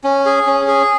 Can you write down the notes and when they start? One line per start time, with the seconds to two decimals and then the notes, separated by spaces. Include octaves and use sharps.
0.04 C#4
0.25 G#4
0.47 C#4
0.68 G#4